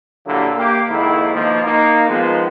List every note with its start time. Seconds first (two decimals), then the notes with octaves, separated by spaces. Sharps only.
0.26 A#2 D3 F#3 G3 A#3 E4
0.56 A#3 G4
0.89 F2 G#2 D#3 A#3 E4
1.34 B2 D#3 F3 A#3
1.64 A#3 D#4
2.08 D#3 F3 G#3 B3